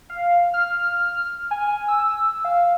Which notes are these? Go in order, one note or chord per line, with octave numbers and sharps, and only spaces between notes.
F5
F6
G#5
E6
F5